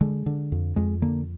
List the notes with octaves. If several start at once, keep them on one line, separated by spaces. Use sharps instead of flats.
D3 G#3
D3
F2
F2 G#3
D3 A#3